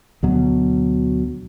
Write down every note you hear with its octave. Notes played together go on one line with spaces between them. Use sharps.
D2 B2 F#3